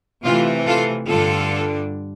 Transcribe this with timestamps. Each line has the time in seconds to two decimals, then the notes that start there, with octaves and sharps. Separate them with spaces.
0.24 C3 E3 A3 F4
0.66 F4 A4
1.08 G2 D3 G3 D4 F4 A4